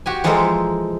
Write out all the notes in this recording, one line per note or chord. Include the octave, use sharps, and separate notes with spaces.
F#4 G4 G#5
E3 F3 G#3 A4 A#4 C5